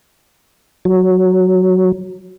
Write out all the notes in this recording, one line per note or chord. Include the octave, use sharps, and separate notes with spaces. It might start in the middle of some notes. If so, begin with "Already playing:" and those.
F#3